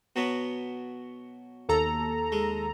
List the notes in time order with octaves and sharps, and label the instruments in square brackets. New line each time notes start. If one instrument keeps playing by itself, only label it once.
[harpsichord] B2 F#3 B3
[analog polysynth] D#2 A4 A#5
[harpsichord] G#3